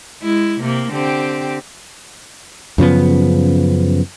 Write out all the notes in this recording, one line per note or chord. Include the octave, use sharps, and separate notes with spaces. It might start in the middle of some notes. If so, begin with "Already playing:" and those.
G#3 E4
C3 A#3
D3 C4 G4
F#2 C#3 F3 B3